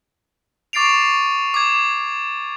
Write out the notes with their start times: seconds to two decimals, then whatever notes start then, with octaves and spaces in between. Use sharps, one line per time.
0.73 C#6 D6 A6 C7 D7 F7
1.54 D6 G#6